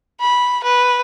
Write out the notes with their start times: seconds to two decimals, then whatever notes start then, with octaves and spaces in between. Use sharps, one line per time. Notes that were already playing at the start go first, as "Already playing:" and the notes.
0.21 B5
0.64 B4